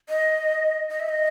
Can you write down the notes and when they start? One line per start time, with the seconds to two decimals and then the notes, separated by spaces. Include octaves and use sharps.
0.09 D#5
0.90 D#5
1.00 E5
1.09 D#5